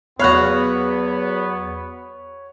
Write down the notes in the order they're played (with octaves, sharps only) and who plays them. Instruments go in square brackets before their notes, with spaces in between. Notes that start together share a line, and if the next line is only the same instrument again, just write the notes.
[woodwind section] E2 [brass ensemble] F#3 B3 [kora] F#4 F5 [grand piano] C#5 B5 F#6